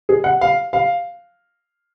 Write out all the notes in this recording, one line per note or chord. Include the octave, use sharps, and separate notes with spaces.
G#4
F#5
F5
F5